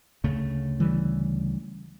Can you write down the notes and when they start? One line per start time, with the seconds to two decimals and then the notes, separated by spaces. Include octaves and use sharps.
0.24 D2 C#3 A3
0.80 E3 G3